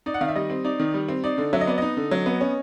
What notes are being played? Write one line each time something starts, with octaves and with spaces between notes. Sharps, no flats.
D#4 D5
F#5
D#3 F5
E5
G3 D#5
C4
D#4 D5
D#3
G3
C4
D#4 D5
D3
F#3 E5
D#5
B3 D5
D#4 D#5
D3
F#3
B3
C#4